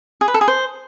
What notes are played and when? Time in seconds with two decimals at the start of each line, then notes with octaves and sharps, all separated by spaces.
0.21 G#4
0.28 B4
0.34 A4
0.41 G#4
0.48 C5